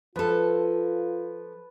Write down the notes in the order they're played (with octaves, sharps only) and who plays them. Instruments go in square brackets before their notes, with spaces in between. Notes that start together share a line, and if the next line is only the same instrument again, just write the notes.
[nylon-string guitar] F3 A4 [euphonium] F4 [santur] B4